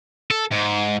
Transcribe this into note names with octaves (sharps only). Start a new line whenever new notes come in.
A4
G#2